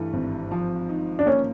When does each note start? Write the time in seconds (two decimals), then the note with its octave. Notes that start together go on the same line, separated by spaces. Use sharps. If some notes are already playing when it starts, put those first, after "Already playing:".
Already playing: G2 E3 A3
0.13 G#1
0.51 F3
0.89 D#4
1.19 D4
1.26 A#3 C#4